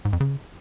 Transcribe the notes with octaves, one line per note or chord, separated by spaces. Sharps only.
G#2
F2
C#3